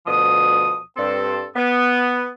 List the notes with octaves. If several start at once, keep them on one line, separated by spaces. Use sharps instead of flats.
D2 B2 F3 D#6
G2 C4 A4
B3